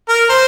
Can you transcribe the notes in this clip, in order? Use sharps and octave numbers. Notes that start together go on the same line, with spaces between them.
A#4
C5